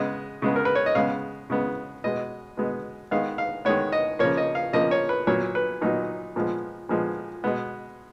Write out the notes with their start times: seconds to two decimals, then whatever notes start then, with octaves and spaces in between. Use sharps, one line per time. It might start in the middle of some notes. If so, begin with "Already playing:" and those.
Already playing: C#3 G#3 B3 D#5
0.42 C#3 G#3 B3
0.56 A#4
0.65 B4
0.75 C#5
0.86 D#5
0.95 C#3 G#3 B3 F5
1.50 C#3 G#3 B3
2.04 B2 G#3 B3 D#5
2.57 B2 G#3 B3
3.11 D#3 G#3 B3 F5
3.38 F5
3.65 D#3 G#3 B3 C#5
3.92 D#5
4.19 C#3 F3 A#3 C#5
4.37 D#5
4.55 F5
4.73 C#3 F3 A#3 D#5
4.91 C#5
5.09 B4
5.27 A#2 F#3 B3 C#5
5.55 B4
5.81 A#2 F#3 B3 D#4
6.36 A#2 F3 G#3 B3
6.89 A#2 F3 G#3 B3
7.44 B2 G#3 B3